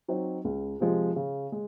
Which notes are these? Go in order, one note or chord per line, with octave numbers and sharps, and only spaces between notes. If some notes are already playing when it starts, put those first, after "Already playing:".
F#3 C4 D#4 F#4
C#2
C3 F3 G#3
C#3
G#3